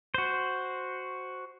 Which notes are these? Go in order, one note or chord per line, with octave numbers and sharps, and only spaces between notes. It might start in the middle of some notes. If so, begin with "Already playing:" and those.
F#4 C5